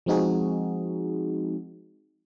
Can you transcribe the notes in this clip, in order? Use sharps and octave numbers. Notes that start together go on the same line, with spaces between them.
F3 G#3 C4 D#4 F#4 G#4